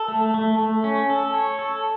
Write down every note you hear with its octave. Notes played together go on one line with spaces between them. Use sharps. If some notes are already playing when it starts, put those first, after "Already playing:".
Already playing: A4
A3
A3
A3
C#4
A4
C#5
A4